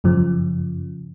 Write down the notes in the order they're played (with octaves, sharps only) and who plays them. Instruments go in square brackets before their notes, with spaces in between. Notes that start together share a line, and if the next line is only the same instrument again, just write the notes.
[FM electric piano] F#2 C#3 F3